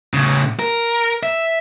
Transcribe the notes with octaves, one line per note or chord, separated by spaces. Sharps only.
A2 C#3
A#4
E5